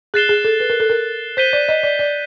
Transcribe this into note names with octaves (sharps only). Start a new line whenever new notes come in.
G#4 F#6 A6 C7 E7 G7
G#4
A4
B4
A#4
A4
A#4
C5 G6 B6 D#7 G7
D5
D#5
D5
D5